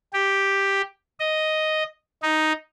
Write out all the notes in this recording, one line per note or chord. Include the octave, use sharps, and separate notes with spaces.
G4
D#5
D#4